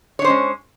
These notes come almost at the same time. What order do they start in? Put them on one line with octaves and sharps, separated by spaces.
C#5 D4 C5 C#4 G#3